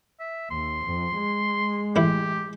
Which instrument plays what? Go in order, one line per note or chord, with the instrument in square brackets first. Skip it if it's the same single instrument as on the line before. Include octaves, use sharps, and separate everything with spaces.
[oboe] E5
[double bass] D#2 [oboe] C6
[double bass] F2
G#3
[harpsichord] A1 E4 [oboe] G4